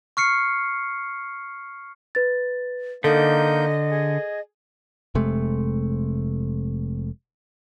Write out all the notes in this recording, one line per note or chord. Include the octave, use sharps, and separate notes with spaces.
C#6 F6 C7 C#7
B4 A6
D3 A#3 D#4 A4 D#5 G6
G#4
F1 C3 G#3 A3